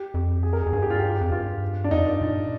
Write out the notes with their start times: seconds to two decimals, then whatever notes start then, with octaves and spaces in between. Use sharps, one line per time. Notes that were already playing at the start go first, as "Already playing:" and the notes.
Already playing: G4
0.14 F2
0.43 G#4
0.53 A#4
0.62 G#4
0.66 F2
0.73 G2 G#4
0.82 G4
0.90 F4
0.99 G4
1.21 F2
1.32 G2 F4
1.84 D4
1.91 F2 D#4
2.06 G2
2.21 A#2